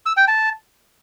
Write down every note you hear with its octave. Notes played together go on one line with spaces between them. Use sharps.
E6
G5
A5